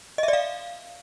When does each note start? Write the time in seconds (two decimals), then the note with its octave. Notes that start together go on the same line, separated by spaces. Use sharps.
0.18 D#5
0.23 E5
0.28 D5
0.33 F5